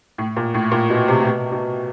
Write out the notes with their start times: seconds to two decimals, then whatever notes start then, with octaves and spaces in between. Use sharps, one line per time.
0.18 A2
0.37 A#2
0.54 A2
0.72 A#2
0.90 B2
1.08 C3
1.25 B2
1.52 B2